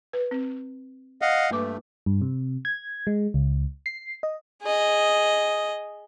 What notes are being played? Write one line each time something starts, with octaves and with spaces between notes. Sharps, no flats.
B4
C4
D#5 F5 F#5
G2 A3 A#3 B4 D6
G2
C3
G#6
G#3
C#2
C7
D#5
G#4 D#5